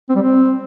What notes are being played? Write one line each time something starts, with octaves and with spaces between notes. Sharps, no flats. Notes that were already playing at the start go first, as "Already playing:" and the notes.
C4
G3
C4